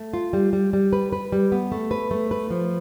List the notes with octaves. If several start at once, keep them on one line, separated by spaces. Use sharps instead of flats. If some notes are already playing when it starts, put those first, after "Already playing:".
Already playing: A3
F4
G3
G3
G3
B4
B4
G3
B3
A3
B4
A3
B4
F3